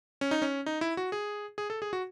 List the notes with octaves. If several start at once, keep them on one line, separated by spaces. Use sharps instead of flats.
C#4
D#4
C#4
D#4
E4
F#4
G#4
G#4
A4
G#4
F#4